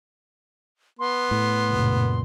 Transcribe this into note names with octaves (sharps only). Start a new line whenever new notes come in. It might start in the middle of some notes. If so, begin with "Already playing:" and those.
B3 C6
A2
C#2 F#2 A#2